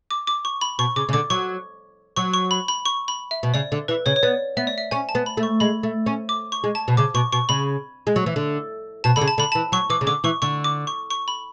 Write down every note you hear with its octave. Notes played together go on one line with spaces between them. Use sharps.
D6
D6
C#6
B5
B2 C#6
C#3 D6
C#3
D3 D6
F#3 C#6
F#3 C#6
C#6
B5
B5
C#6
B5
E5
B2
C#3 D5
D3
E3 B4
C#3 C#5
C#5
B3 D5
B3 E5
D5
E5
C#4 G#5
A5
B3
B5
A3
C#6
G#3 B5
A3
C#4
D6
C#6
G#3
A5
B2
C#3 D6
B2 C#6
B2 C#6
C#3 B5
G#3
F#3
E3
D3
B2 A5
D3 B5
C#3
A5
D3 B5
A5
E3
F#3 C#6
E3 D6
C#3
D3 D6
E3 C#6
D3 C#6
D6
C#6
C#6
B5